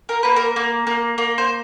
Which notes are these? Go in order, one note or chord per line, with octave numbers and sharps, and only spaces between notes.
A#4
A#3 B4
A#4
A#3
A#3
A#3
C5